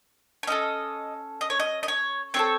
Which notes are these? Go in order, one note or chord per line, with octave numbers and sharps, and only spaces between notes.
C#5
C#4 E4 A4 D#5
D#5
C#5
D#5
D#5
C#5
C4 F#4 A4 C#5